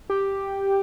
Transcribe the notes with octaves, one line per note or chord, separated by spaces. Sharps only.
G4